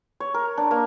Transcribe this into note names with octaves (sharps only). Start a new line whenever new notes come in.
C#5
A#4
D4
A#3